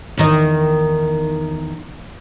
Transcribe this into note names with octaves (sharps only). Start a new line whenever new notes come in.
E2 D#3 D#5